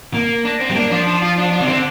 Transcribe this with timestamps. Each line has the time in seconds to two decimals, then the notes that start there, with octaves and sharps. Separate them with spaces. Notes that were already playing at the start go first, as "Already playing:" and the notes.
0.14 A#3
0.45 D4
0.60 C4
0.70 G3
0.75 A#3 D4
0.90 F3 D4
1.07 D4
1.22 F4
1.38 D4
1.52 D4
1.61 C3
1.68 D3 C4